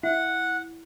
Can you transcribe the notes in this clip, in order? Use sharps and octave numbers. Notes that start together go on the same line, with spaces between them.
E4 F#5